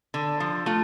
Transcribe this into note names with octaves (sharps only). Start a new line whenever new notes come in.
D3
F3
A3 F4